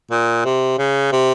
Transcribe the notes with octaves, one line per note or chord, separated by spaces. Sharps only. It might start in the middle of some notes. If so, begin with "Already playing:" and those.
A#2
C3
C#3
C3